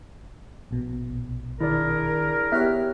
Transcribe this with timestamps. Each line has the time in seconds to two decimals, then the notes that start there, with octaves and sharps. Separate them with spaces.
0.71 A#1 B2
1.61 D#3 D4 E4 G#4 A#4 D5
2.52 B3 E4 G4 C#5 E5 F6 F#6